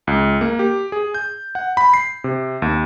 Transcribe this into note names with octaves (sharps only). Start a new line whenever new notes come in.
C#2
A#3
G4
G#4
G6
F#5
B5
C7
C3
D#2